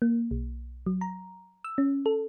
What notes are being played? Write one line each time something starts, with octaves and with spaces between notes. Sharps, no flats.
A#3
B1
F#3
A#5
E6
C#4
A4